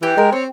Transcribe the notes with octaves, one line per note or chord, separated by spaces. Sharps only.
E3 G4
G#3 A#4
C4 C#5